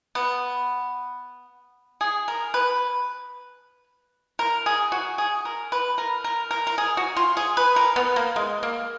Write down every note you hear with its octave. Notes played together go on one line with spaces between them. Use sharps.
B3
G#4
A#4
B4
A#4
G#4
F#4
G#4
A#4
B4
A#4
A#4
A#4
A#4
G#4
F#4
F4
G#4
B4
A#4
B3
A#3
G#3
A#3